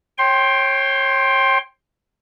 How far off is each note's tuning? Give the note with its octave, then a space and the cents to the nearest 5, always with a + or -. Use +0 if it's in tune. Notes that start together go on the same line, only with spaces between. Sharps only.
C#5 -25 G5 +0 C6 +15